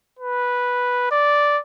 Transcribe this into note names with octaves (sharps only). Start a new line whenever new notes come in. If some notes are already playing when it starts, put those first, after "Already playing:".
B4
D5